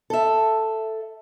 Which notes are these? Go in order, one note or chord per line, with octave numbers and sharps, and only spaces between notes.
A4 E5